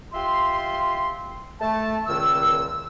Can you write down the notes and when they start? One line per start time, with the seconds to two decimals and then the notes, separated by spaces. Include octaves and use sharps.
0.13 F4 G4 E5 C6
1.60 A3 A5
2.06 C#2 A#2 D#3 E6